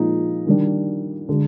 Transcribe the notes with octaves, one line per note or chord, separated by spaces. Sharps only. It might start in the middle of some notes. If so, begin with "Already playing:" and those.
Already playing: A#2 F3 G#3 D#4
D#3 G3 D4
D3 G#3